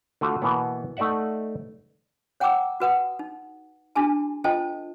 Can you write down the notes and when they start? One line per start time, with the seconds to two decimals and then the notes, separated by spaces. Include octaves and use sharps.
0.21 D3 A3 F4 F#4
0.42 B2 E3 A#3 B3
0.97 A3 D#4 D5 E5 F#5
2.40 C#5 F#5 G5 A#5 D6 E6
2.80 F#4 B4 F#5 D#6
3.19 D#4
3.95 D4 E4 F#4 G#4 G#5 A5
4.44 F4 A4 C5 D#5 G5 A5